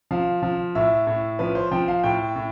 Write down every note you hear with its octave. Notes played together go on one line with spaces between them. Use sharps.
F3 F5
F3
A2 E5
A2
F3 B4
C5
F3 G5
F5
A2 G5
A2